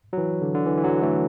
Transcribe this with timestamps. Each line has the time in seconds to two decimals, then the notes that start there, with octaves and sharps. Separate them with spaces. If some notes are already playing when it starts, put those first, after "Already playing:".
0.13 F#3
0.18 E3
0.42 D3
0.55 D3
0.66 E3
0.78 E3
0.84 D3 F#3
1.02 E3 A3